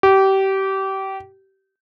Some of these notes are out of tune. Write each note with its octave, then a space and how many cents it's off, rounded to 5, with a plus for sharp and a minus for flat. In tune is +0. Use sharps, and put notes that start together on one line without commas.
G4 -25